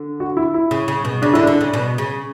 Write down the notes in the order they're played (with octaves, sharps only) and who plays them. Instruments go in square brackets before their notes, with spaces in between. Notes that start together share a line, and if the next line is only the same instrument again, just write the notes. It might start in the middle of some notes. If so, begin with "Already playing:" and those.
Already playing: [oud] D3
[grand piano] F#4
E4
E4
[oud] C#3
C#3
B2
[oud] C#3 [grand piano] D4
[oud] D3 [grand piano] E4
[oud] D3 [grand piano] D4
[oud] C#3
B2
C#3